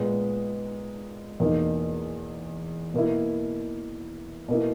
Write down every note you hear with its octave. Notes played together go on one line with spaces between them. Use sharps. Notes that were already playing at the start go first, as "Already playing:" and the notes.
Already playing: A#2 G#3 B3
E2 B2 A#3 D#4
B2 A#3 E4
B2 A#3 E4